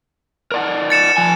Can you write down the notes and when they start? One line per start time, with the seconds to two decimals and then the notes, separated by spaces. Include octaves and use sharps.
0.52 A#4 D5 F#5
0.90 A6 C#7 E7
1.17 F3 G#5